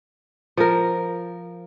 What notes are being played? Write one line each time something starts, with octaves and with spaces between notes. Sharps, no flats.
F3 A#4